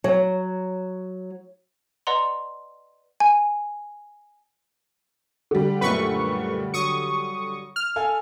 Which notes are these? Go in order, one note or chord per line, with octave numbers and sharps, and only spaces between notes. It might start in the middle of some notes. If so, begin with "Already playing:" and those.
F#3
B4 D5 D#5 F#5 A#5 C6
G#5
D3 G3
F#2 A#2 A3 B4 C#6
F#3 C#6 D#6
F6
A4 F5 G#5